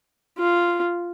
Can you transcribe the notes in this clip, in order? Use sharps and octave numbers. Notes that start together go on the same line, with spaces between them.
F4